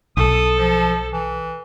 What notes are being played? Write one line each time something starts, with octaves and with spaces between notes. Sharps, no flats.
B1 A4 D#6
F3
E3